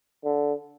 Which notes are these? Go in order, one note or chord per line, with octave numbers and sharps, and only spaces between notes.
D3